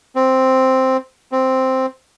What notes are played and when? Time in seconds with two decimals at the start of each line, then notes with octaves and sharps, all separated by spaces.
0.16 C4
1.32 C4